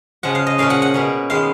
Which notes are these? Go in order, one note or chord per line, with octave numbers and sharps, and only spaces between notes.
C#3 F3 G#3 F#5
F5
D#5
A#2 F3 A#3 C#4 F5
F#5
F#5
B2 A#3 C#4
D#3 G#3 B3 F5